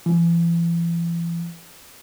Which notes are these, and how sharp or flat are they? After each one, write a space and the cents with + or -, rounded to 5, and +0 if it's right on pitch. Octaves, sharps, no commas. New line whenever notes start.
E3 +40